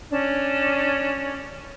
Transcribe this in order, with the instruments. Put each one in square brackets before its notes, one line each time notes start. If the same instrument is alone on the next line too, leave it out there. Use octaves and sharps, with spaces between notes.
[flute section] C#4 D4